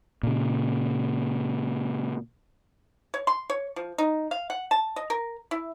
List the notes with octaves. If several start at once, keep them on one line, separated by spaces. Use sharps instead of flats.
A#2 C#3
C#5
C6
C#5
F3
D#4
F5
F#5
A5
D#5
A#4
E4